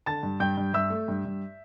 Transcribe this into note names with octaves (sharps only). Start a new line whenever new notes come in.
D3 A5 A6
G2
G2 G5 G6
G2
G2 E5 E6
A3
G2
G2